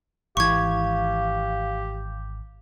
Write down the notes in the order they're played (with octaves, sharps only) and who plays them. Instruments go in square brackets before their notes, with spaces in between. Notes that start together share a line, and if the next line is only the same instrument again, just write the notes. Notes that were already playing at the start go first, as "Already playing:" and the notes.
[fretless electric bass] G#1 E3 [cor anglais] G4 [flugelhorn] F5 [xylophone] C#6 G#6